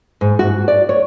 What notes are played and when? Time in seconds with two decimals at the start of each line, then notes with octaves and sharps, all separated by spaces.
0.21 G#2
0.39 F#4
0.68 D5
0.89 C#5